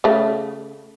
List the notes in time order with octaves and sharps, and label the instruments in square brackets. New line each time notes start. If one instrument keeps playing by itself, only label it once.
[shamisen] C#3 A3